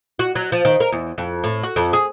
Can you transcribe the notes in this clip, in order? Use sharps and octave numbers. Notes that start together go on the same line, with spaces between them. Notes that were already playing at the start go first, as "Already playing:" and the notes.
F#4
F#3
F3
D#3
A#4
E2
F2
A2
F#4
F2
G#4